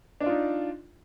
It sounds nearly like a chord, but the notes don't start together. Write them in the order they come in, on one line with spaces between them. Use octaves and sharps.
D4 D5 F4 D#4